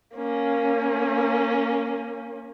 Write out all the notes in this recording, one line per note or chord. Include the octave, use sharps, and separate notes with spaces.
A#3 C#4